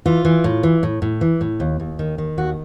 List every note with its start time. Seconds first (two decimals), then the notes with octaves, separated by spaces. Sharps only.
0.06 E3 F4
0.25 E3
0.44 A2
0.63 E3
0.83 A2
1.02 A2
1.21 E3
1.41 A2
1.60 D#2
1.80 D#2
1.99 D#3
2.18 D#3
2.38 D#2 F#4